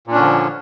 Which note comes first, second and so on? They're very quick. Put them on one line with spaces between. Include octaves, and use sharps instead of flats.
A#2 D4 C#4 D3 F3